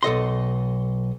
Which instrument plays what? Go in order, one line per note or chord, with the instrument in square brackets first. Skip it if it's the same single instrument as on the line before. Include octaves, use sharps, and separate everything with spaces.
[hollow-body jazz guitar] B1 A4 D#5 C6